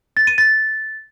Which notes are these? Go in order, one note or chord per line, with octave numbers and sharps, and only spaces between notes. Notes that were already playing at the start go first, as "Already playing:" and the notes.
A6
D#7
A6